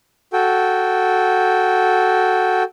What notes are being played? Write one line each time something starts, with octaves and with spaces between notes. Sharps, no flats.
F#4 A4 G5